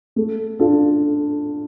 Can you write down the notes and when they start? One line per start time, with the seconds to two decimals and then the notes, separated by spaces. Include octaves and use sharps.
0.16 A3
0.59 D4 F4 A4